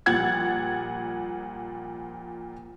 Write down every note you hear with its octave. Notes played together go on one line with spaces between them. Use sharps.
A#2 F3 G3 F#5 G#6 A6